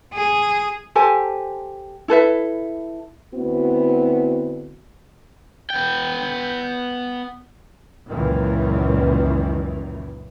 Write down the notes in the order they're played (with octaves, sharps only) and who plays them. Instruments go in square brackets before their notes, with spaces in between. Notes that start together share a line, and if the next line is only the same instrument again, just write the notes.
[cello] G#4
[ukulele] G4 A4 C5 G#5
E4 A4 B4 E5
[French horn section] D2 B3 C4 E4 F#4
[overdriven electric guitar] B3 G5
[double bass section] C#2 F#2 A#2 D#3 E3